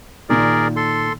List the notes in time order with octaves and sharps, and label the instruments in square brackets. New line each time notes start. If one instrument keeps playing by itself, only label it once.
[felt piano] A#2 D#3 [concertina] G#4 A#4 D5
[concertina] A4 C6